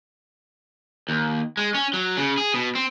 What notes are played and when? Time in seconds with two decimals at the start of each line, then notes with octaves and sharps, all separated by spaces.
1.09 D#2
1.57 G#3
1.75 C#4
1.93 F#3
2.17 C#3
2.38 G#4
2.54 B2
2.75 C4